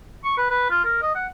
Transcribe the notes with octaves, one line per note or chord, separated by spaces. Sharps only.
C#6
B4
B4
F4
A#4
D#5
F#5